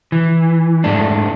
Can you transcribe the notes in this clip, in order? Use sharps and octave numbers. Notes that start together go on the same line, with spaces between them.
E3
G#2 A3 D4